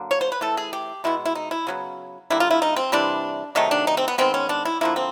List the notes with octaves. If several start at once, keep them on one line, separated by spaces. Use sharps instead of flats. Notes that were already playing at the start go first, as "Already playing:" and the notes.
Already playing: D3 F#3 A#3
C#5
C5
B4
E3 A3 A4
G#4
G4
B2 G#3 B3 E4
E4
D#4
E4
C#3 F#3 B3
D3 G3 A#3 E4
F4
E4
D#4
C4
C3 E3 G3 D4
C3 D#3 F#3 A3 D#4
D4
D#4
C4
B3
D#3 G#3 B3 C4
C#4
D4
E4
D3 F3 A#3 E4
C4